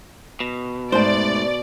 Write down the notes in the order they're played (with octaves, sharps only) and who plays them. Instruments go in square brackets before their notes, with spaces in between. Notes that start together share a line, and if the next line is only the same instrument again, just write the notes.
[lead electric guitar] B2
[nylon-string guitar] G#2 A3 A5 [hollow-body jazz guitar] C5 [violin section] D5